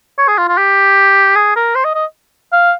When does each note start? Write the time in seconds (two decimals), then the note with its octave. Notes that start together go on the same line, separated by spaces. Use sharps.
0.18 C#5
0.28 G#4
0.38 F4
0.48 F4
0.58 G4
1.35 G#4
1.56 A#4
1.75 C5
1.84 D#5
1.95 D#5
2.53 F5